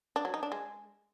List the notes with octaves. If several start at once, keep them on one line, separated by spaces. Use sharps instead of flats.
D4
F#3
D#4
D4
G#3